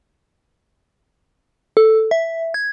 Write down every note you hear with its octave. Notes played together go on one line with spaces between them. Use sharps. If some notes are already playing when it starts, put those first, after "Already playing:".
A4
E5
G#6